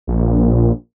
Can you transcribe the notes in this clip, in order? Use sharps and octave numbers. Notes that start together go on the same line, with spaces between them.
A#1